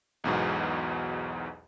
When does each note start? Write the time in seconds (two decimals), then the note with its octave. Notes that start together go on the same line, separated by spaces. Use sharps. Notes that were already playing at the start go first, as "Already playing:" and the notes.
0.24 B1 E2 G#2 B2